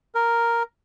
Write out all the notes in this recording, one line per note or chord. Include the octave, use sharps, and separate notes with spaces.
A#4